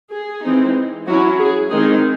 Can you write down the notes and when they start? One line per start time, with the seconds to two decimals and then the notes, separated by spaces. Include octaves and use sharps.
0.13 G#4
0.44 E3 G#3 C4 D#4
1.07 F#3 C#4 E4 F#4
1.39 G#4
1.70 D#3 G#3 C4 D#4 G#4